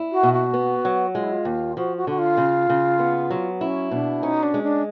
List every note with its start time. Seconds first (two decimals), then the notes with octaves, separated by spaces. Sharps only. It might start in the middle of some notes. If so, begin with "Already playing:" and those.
Already playing: E4
0.12 F#4
0.23 B2
0.33 F#4
0.54 B3
0.85 F#3
1.14 G#3 F4
1.23 E4
1.32 F4
1.45 D#2
1.77 F3 F#4
1.97 F#4
2.07 D3 F#4
2.18 F4
2.37 C#3
2.69 C#3
2.99 B3
3.30 F#3
3.61 C#4 E4
3.91 B2 D4
4.22 C#4 D#4
4.43 D4
4.54 G#3
4.63 D4